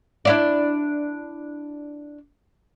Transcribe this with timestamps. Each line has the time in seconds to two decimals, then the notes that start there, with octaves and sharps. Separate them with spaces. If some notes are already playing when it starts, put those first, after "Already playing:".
0.25 D4 E4 D5